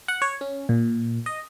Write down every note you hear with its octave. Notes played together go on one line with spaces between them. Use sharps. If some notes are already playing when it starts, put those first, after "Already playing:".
F#5
C#5
C#4
A#2
D#5